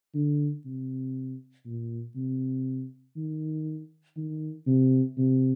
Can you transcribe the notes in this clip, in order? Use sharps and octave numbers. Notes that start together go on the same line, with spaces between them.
D3
C3
A#2
C3
D#3
D#3
C3
C3